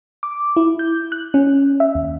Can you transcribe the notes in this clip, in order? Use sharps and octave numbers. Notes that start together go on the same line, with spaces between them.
D6
E4
G6
F#6
C#4
E5
D#2